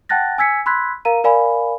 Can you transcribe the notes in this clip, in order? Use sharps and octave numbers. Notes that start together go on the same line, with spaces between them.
F#5 G5 A5 F#6 A6 A#6
G#5 E6 G#6 B6 C#7
B5 C6 E6 F#6 G#6 B6
A#4 F5 A#5 D#7
A#4 D5 F5 G#5 B5